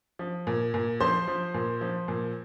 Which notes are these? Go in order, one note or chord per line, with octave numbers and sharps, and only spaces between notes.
F3
A#2
A#2
F3 C5 C6
F3
A#2
F3
A#2